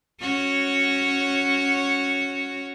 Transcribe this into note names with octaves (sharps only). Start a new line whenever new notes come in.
C#4 F#4 C#5